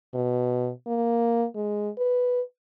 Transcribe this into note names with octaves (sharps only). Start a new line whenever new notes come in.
B2
A#3
G#3
B4